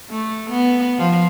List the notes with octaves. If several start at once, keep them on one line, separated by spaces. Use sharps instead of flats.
A3
B3
F3